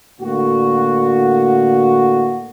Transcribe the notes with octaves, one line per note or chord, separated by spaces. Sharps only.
A2 D3 A#3 F#4